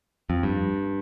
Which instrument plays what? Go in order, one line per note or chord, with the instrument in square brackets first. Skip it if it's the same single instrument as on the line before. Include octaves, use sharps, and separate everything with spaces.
[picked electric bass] F2
G2